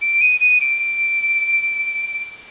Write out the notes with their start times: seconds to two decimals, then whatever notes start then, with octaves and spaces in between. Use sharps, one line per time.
0.02 D7
0.21 D#7
0.41 D#7
0.61 D7